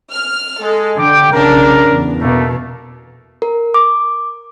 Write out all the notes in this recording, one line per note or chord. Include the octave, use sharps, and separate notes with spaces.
F6
G#3 A4
D3 G5 D6
B1 C#3 D4 A#4
E2
B2 A3 A#3
A#4
D6